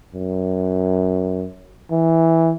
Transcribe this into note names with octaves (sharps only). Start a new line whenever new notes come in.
F#2
E3